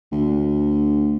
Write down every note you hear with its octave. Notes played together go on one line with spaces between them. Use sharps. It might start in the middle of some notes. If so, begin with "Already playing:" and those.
D2